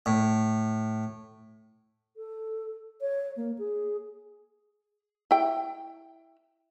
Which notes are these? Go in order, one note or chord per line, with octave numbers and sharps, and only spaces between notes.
A2
A4
C#5
A#3
G#4
E4 G5